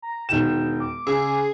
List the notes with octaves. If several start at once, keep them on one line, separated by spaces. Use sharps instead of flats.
A#5
E1 D#3 G5 E7
D6
C#3 G#4 E6